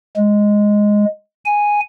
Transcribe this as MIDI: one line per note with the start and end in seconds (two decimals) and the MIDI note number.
0.17 1.05 56
1.45 1.80 80